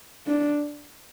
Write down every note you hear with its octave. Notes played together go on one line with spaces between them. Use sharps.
D4